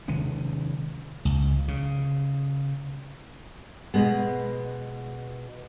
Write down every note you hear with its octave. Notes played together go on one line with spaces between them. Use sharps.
C3 D#3 G#3 C#4
C#2
C#3
B2 G#3 B3